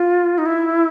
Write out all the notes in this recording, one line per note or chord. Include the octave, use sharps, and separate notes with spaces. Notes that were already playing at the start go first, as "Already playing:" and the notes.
Already playing: F4
D#4
E4